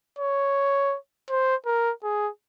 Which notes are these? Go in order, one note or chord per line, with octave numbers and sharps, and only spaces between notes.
C#5
C5
A#4
G#4